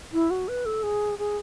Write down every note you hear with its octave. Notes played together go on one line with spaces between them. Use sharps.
E4
F#4
B4
A4
G#4
G#4